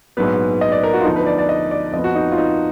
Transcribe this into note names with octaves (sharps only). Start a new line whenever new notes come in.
A#1 G#2 F#3 B3 B4
D#5
D5
A#4
F#4
F4
D2 D3 F3 B3 D#4
B4
D5
D5
D#5
D5
F2 F3 B3 D#5
F#4
D#4
F4
D#4